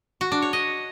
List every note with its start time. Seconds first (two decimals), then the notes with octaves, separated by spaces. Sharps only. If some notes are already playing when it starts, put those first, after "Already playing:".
0.21 F#4
0.32 D4
0.42 C#5
0.53 D#5